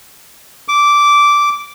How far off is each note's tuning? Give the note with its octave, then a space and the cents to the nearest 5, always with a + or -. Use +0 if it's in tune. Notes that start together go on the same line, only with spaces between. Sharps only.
D6 -10